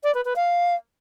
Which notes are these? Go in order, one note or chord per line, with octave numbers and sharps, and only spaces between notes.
D5
B4
B4
F5